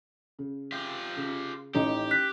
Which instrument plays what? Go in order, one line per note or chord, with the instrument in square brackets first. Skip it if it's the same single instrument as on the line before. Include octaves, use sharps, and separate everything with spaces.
[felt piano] C#3
[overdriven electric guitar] F4 G4
[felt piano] C#3
[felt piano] A1 C#4 D#4 [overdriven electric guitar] G4
[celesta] F#6 B6